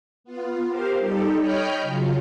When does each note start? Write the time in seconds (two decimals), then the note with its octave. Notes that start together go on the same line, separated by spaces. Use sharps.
0.24 B3 F4
0.68 G4 A#4 C5 F5
0.98 G3 D#4 G4 A4
1.39 C#5 D#5 G5 B5 F6 G6
1.82 C#3 F#3 F4